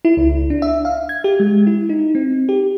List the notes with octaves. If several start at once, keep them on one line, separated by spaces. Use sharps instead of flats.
E4
C#2
D4
E5
F5
G#6
G4
G#3
E4
D#4
C4
G4